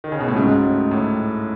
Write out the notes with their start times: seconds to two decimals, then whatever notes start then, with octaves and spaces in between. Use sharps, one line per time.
0.04 D#3
0.12 C#3
0.20 B2
0.28 A2
0.36 C#2 G#2 C#3 F#3
0.63 A2
0.91 A2